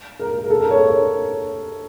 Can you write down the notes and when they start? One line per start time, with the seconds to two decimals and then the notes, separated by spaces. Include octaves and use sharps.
0.20 A#4
0.44 A#4
0.50 A4
0.60 A#4
0.71 C#5
0.81 A#4